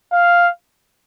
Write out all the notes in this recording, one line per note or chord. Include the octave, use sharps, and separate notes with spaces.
F5